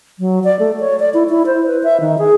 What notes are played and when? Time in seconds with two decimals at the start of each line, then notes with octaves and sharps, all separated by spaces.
0.19 F#3
0.44 D5
0.59 A3
0.80 C#5
1.00 D5
1.14 E4
1.29 E4
1.46 C5
1.67 B4
1.83 E5
2.00 D#3
2.18 G#4